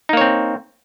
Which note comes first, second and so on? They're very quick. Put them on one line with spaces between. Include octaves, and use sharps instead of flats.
D#4 A#3 C#5 C4